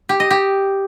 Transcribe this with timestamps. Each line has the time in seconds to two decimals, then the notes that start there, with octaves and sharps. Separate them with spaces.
0.09 G4
0.20 D#5
0.31 G4